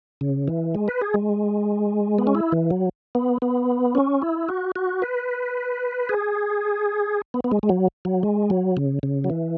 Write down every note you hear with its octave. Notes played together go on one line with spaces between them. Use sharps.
C#3
E3
G#3
B4
G#4
G#3
B3
C#4
E4
E3
F#3
B3
B3
C#4
E4
F#4
F#4
B4
G#4
B3
B3
G#3
G#3
F#3
F#3
G#3
F#3
C#3
C#3
F#3
E3